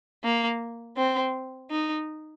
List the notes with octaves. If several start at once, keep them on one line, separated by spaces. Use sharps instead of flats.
A#3
C4
D#4